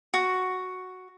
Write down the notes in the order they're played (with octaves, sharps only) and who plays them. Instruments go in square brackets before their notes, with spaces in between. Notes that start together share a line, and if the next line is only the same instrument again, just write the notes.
[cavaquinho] F#4